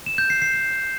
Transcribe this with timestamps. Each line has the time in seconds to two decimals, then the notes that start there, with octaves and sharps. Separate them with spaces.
0.06 E7
0.18 G6
0.30 C7
0.42 C7
0.54 C7